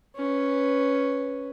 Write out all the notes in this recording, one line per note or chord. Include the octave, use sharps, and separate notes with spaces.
C#4 B4